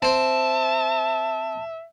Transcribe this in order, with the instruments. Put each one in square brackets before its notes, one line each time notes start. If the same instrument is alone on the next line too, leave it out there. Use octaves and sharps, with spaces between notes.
[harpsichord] C4 C5 [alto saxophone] E5 [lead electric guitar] A5